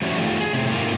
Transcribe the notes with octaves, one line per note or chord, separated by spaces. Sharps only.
F3 G3 A3 C#4 E4 F#4
D#3 A3 F4
G#4
A2 C3
G#2 A#3 F4